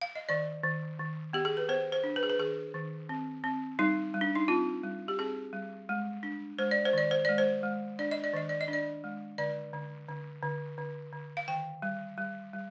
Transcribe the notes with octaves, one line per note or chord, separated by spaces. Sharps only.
F5
D#5
D#3 D5
D#3
D#3
B3 G4
G#4
B4
B3 C5
C5
D4
B4
G#4
B4
D#3 G#4
D#3
C4
C4
G3 D#4
G3
D4
D#4
C4 F4
G3
G4
C4 G#4
G3
G#3
D4
G#3 C5
D5
C5
D#3 D5
C5
G#3 D5
C5
G#3
D4 D5
D#5
D5
D#3 D#5
D5
D#5
D4
D5
G#3
D3 D5
D3
D3
D3
D3
D3
F5
D#3 G5
G3
G3
G3